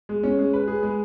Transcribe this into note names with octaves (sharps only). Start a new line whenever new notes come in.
G#3
C#4
G#3
B4
G#4
G#3